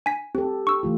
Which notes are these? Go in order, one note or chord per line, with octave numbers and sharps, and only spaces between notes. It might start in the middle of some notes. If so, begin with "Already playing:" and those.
G#5 B6
C4 G4 A4
C#6 E6
E3 A3 F4